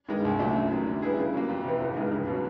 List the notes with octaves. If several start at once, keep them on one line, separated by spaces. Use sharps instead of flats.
G2 D#3 G#3
C2
A#2 F#3 A3 D4
F#2
D#3 F#3
D3
G3 B3 E4 G#4
C#3
F#3 A#3
F2
C3 E3
A1
G2 D#3 G#3
C#2
B2 F#3